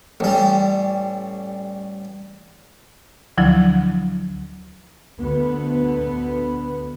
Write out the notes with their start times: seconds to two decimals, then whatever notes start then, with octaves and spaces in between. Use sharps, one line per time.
0.20 A1 G3
3.38 D2 D3 F3 F#3 E4
5.20 D2 B3